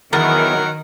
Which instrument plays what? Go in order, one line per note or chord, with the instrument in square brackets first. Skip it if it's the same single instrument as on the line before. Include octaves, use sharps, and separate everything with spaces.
[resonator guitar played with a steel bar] E2 [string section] D#3 [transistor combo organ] E3 B3 [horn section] F#3 A#4 F#5